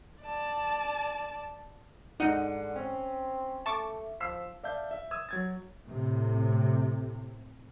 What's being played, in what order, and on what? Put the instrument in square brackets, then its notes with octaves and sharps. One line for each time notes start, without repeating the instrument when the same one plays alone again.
[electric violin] D5 A5
[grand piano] G#2 F#5 D#7 [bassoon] D3 [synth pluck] D#4
[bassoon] C4 [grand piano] C#4
[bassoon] A3 [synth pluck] A5 C#6 D6
[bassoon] F3 [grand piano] E6 B6 C7
[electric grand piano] D5 E5 F5 A5 G6
E5
D#6 E6 G#6
F#3 G#6 A6
[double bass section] A2 C3